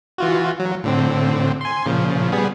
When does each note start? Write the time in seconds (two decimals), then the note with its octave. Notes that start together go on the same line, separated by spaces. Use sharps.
0.18 E3 F4 F#4
0.60 F#3
0.84 A2 D3 C4
1.61 G#5 C6
1.86 A#2 C#3 F3
2.32 G3 B3 G#4